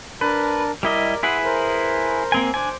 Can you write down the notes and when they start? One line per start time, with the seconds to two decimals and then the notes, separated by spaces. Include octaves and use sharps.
0.21 D4 A#4 B4 A5
0.83 G3 E4 A#4 D5 D#5
1.23 E4 G#4 B4 F#5 C6 E6
1.44 A#4 C5
2.32 A#3 C4 G#5
2.54 D4 C5 G#5 D6